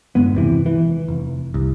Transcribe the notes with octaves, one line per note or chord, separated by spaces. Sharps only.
F#1 G2 G#3 B3
E1 C3 E3
E3
F1
C2